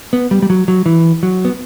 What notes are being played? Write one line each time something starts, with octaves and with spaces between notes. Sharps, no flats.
B3
G3
G3
F#3
F#3
E3
F#3
B3